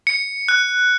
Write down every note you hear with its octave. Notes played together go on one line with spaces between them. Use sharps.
C#7
F#6